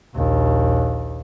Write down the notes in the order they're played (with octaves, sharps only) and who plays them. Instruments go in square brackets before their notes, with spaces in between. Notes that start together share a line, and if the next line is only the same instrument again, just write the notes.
[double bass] A#1 D#2